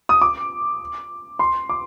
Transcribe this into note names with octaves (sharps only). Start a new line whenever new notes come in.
D#6
D6
C6
D6